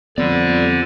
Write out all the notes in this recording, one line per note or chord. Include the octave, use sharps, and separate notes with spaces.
F2 D3 G3 B3 D5